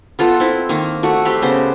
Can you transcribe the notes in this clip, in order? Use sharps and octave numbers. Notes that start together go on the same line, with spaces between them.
B3 F4 A4 F#5
C4 E4
D#3 A#3
A3 F#4 F#5
C4 G4 B5 C6
C#3 B3 C5